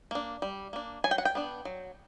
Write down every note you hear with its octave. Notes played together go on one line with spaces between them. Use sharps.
A#3 D4
G3
A#3 D4
F#3 G#5
G5
F#5
G5
B3 D4
F#3